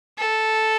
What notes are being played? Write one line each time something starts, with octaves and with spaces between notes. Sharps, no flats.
A4